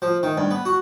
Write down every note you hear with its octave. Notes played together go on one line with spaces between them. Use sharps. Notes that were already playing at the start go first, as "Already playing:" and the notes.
F3
D#3
G2
B3
F#4